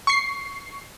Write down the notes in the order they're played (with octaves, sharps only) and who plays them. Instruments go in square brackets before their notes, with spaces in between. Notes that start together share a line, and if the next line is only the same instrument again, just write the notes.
[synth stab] C#6 C7